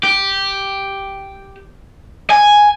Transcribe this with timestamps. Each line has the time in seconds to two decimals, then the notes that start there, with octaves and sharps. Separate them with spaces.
0.03 G4
2.30 G#5